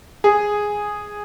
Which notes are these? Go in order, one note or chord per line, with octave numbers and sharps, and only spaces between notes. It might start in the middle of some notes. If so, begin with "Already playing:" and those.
G#4